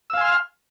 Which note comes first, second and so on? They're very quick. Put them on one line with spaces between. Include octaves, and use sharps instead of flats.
E6 F5 G#5 C6 F6